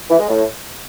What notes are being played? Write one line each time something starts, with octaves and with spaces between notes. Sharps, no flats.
E3
G#3
A2